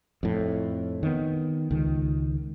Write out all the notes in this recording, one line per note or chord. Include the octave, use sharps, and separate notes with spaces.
F2 A2
D#3 B3
C#2 D#3